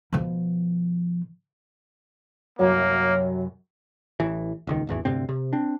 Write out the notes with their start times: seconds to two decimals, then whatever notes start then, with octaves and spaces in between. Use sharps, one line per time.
0.13 B2 F3
2.59 C2 F#2 F#3 A#3
4.20 A1 E3
4.67 D#1 C#2 D#3
4.87 D1 G#1 E2 E3
5.05 D2 G2 C3 C4
5.29 C3
5.53 C4 D4